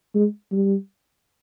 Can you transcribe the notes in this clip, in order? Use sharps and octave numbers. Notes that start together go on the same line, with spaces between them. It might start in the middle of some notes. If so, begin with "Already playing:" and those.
G#3
G3